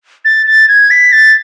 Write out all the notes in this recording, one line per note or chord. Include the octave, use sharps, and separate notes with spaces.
A6
A6
G#6
B6
A6